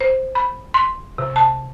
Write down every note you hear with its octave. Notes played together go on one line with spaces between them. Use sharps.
C5
B5
C6
C3
A5